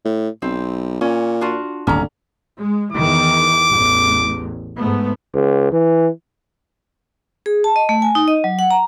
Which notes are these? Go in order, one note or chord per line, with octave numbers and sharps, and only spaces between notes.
A2
B1 C4
A#2 C#4
D4 F4 F#4
D1 G1 D#2 D3 C#4 A#5
G#3
E2 D#3 E3 D6
A1 E2
G#2 A3 B3
C#2
E3
G#4
A5
D#5
A3
G#5
D#4
D#5
F#3
F#5
A#5